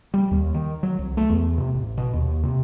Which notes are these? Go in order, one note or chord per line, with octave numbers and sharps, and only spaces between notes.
G3
D#2
D#3
F#3
C2
A3
E2
C3
A1
B2
D#2
C3